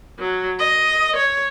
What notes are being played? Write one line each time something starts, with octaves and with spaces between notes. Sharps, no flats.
F#3
D#5
C#5